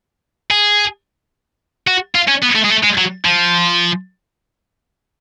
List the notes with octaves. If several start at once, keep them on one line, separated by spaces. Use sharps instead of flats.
G#4
F#4
F4
C#4
B3
A3
G#3
A3
G#3
F#3
F3